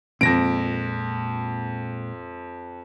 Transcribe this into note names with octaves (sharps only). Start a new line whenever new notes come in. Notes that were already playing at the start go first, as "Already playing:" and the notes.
F2 A#2 G#3 C4 A#6 D7